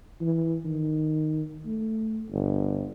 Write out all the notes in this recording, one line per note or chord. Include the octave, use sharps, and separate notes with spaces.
E3
D#3
A3
G1